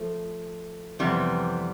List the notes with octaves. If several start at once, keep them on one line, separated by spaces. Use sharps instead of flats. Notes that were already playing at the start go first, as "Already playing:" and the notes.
Already playing: F3 A3
F2 C3 E3 G3 B3